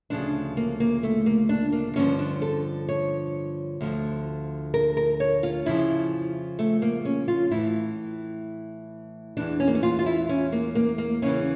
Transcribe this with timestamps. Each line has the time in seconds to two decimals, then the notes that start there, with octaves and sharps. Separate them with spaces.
0.10 D2 C#3 F3 D4
0.57 A#3
0.80 A#3
1.03 A3
1.26 A#3
1.49 D4
1.72 A#3
1.96 G2 D3 F3 C#4
2.19 D4
2.42 A4
2.88 C#5
3.81 D2 D3 F3
4.74 A#4
4.97 A#4
5.20 C#5
5.43 F4
5.66 F2 C#3 F3 E4
6.59 A3
6.82 A#3
7.05 C#4
7.28 F4
7.51 A2 E3 E4
9.37 E2 E3 D4
9.60 C#4
9.67 A#3
9.75 C#4
9.83 F4
9.99 F4
10.06 E4
10.29 C#4
10.52 A#3
10.75 A#3
10.98 A#3
11.22 E2 C#3 E3 C#4